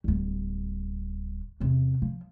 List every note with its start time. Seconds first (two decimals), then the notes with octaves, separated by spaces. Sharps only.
0.04 D1 G3
1.60 E2 C3
2.02 F3